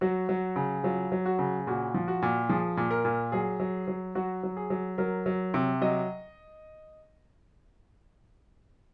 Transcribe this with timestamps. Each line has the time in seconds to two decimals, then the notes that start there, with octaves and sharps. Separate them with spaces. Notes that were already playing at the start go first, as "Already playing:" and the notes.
0.01 F#3 F#4
0.29 F#3
0.56 C#3
0.83 F#3 F4
1.12 F#3
1.26 F#4
1.39 C#3
1.67 A#2 F#4
1.94 F3
2.08 F#4
2.22 A#2
2.49 F3 G#4
2.77 A#2
2.91 A#4
3.05 A#2
3.32 F#3 G#4
3.60 F#3
3.88 F#3
4.15 F#3 F#4
4.43 F#3
4.57 G#4
4.70 F#3
4.98 F#3 A#4
5.26 F#3
5.54 C3
5.82 F#3 D#5